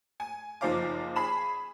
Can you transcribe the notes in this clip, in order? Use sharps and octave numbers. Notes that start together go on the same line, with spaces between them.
G#5
F#1 F3 D#4 C5 F5 D6
G#4 B5 E7